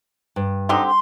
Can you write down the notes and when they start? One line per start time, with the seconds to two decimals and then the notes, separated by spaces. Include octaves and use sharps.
0.36 G2
0.69 D3 C4 D#4 G4
0.86 C6